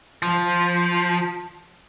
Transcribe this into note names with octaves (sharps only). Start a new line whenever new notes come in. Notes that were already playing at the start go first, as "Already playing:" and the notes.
F3